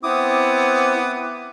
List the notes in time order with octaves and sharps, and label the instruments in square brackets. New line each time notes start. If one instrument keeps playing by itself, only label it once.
[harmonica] B3 [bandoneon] C4 E4 [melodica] D6 D#6